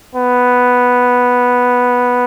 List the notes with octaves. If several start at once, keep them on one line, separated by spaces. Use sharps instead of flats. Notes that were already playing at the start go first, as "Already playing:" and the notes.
B3